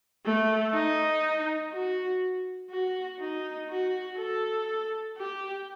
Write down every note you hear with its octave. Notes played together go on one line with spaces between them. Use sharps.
A3
D#4
F#4
F#4
D#4
F#4
A4
G4